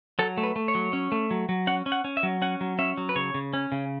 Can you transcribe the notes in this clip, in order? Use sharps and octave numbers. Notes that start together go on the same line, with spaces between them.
F#3 A4
A3
B4
A3
C#5
F#3
C#4
A3
F#3
F#3
C#4 F#5
C#4
F#5
C#4
E5
F#3
C#4 F#5
F#3
C#4 E5
F#3
B4
C#3 C#5
C#3
C#4
C#3